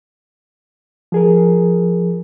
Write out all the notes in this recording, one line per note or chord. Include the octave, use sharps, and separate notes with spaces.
F3 G#4 A#4